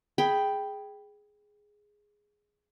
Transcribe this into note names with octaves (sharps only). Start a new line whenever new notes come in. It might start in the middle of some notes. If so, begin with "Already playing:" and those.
G#4 G5 B5